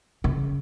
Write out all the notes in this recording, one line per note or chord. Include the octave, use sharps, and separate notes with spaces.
C#3